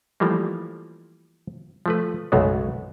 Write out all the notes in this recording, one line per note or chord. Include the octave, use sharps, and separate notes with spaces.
E3 F3 G3 A3 A#3
F3 A3 B4
B1 F#2 C#3 G#3 A3 B3